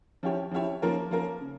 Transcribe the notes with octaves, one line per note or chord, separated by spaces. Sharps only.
F3 C#4 E4 G4 C#5
F3 C#4 E4 G4 C#5
F3 A#3 C#4 F4 A#4
F3 A#3 C#4 F4 A#4
C#3